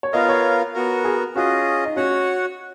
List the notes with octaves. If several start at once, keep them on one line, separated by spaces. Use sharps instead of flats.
C#5
B3 F4 A#4 D#5 F5
C#5
B3 F#4 A#4
G#4
C#4 F4 F#4 G#4 D#5
D#4
C#4 F#4 C#5 F#5